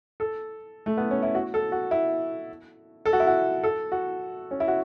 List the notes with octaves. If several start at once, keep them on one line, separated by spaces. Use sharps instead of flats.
A4
A3
B3
C#4
E4
F#4
A4
F#4
E4
A4
F#4
E4
F#4
A4
F#4
C#4
E4
F#4